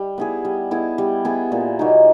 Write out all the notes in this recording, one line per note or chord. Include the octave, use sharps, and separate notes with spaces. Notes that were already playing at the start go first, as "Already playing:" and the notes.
Already playing: G3
B3 E4 G#4
G3
B3 E4 G#4
G3
B3 E4 G#4
A#2
F#3 A#3 D#4